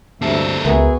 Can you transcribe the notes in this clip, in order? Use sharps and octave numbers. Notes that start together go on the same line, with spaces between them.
D2 G2 C3 A#3 A4 E5
C#2 B3 F#4 G#4 A#4 E5